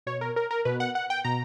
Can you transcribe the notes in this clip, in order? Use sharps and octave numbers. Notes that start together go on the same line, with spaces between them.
B2 C#5
A#4
A#4
A#4
B2 B4
F#5
F#5
G5
B2 A#5